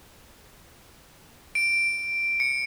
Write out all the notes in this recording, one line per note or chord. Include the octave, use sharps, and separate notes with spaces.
D7
C#7